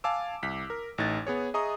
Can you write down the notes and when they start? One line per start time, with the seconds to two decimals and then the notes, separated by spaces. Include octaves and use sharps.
0.04 F5 G#5 A5 D6 E6
0.43 C2 B6
0.70 A#4
0.98 A1 A2 D#4 F#6 G#6 A6
1.27 B3 G#4 C#5
1.54 G#4 D#5 E5 A#5 C#6 D#6